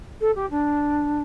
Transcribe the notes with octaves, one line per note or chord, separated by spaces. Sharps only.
A4
G4
D4